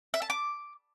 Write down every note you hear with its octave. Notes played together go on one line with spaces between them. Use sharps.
E5
A5
D6